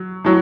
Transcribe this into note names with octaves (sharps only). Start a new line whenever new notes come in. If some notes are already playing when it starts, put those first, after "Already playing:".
Already playing: F#3
A2 F#3